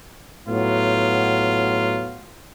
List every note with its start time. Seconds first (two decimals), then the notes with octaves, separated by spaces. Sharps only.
0.48 A2 F#3 B3 F4